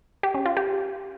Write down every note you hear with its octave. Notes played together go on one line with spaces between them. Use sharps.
G4
C#4
F4
G4